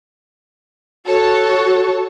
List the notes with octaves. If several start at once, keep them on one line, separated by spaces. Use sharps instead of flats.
F#4 A4 C#5 A5